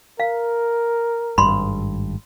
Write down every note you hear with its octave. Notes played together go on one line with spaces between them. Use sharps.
A#4 F5
G#1 G2 B5 C6